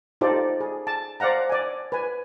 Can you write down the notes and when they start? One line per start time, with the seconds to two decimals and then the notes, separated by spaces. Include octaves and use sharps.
0.21 D#4 F4 G4 A4 C5 D5
0.61 G#4
0.87 A5
1.20 C5 D5 F5 F#5 A#5
1.49 D5 G#5
1.92 B4 G#5